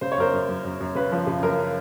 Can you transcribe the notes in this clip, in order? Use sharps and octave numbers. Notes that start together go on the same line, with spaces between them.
C#3 C5
C#5
F#2 A#4 C5
F#2
F#2
F#2
F#2
C#3 B4
F3
C#3
F#2 A#4